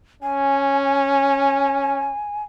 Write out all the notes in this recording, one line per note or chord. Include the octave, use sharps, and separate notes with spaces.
C#4 G#5